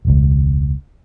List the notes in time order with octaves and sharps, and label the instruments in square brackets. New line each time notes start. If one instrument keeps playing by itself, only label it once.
[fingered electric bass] E1 C#2